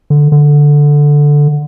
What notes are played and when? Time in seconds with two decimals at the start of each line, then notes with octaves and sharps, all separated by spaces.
0.10 D3
0.32 D3